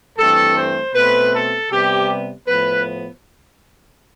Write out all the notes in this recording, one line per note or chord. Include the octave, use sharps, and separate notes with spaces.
G2 E3 A3 C4 A4
C5
B2 A3 C4 B4
A4
C3 G3 B3 G4
A2 F3 B3 B4